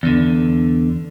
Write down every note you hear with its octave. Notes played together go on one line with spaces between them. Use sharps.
E2 D3